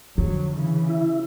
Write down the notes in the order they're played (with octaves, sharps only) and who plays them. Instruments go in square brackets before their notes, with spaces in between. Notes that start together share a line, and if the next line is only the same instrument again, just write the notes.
[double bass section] F2 F#3 [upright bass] D3
[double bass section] C#3 E3
[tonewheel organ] E4